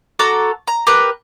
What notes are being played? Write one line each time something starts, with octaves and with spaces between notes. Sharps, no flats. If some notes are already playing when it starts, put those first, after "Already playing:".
F#4 A4 A#5 D6
A#5
G4 A#4 B4 F#6